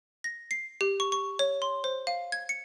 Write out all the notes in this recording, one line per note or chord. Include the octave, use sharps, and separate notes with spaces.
A#6
C7
G4
C#6
C#6
C#5
C6
C5
F5
G#6
C#7